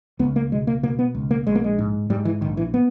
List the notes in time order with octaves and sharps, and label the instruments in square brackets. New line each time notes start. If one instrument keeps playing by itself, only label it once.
[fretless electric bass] C#2 B3
A#3
B2 G#3
A#3
B2 A#3
B3
C#2
A#3
A#1 G#3
A#3
G#3
G#2
G#2 G3
E3
A#1 D#3
E3
B3